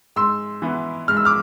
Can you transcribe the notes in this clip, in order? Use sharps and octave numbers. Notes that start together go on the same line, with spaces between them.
G#2 C6 E6
E3 B3 E4
G#2 F6
E6
D6 F6